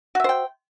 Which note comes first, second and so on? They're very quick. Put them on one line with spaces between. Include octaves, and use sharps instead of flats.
F#4 E5 C5 G5